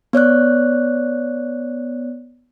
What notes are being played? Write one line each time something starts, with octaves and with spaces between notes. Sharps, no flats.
B3 C#5 D5 F#6